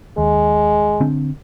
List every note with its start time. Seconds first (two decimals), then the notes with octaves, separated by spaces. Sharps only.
0.18 D#2 G#3
1.00 D3 C4 D4